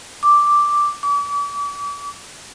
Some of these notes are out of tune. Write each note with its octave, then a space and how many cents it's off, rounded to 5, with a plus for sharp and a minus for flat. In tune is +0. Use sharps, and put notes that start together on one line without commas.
D6 +0
D6 -40